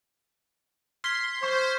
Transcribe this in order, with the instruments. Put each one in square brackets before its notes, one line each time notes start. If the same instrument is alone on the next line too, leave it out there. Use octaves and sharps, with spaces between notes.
[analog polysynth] C6 [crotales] F6 G#6 B6
[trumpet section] C5 [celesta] C#6